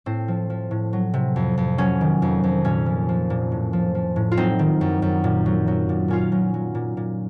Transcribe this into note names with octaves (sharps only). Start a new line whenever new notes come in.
A2 C4
F3
F3
A2
F#3
C3
F2
F2
F#3 C#4
D#3
F2
F2
A#2 C#4
F3
F3
A#2
A2
F3
F3
A2
F4
F#3 C4 D#4
D#3
F#2
F#2
A#2
F#3
F#3
A#2
A#2 C#4 F4
F#3
F#3
A#2
A#2